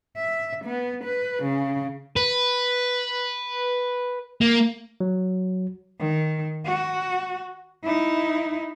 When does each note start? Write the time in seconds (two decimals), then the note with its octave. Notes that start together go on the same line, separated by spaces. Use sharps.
0.17 E5
0.65 B3
1.04 B4
1.43 C#3
2.16 B4
4.41 A#3
5.00 F#3
6.00 D#3
6.66 F#4
7.84 D#4 E4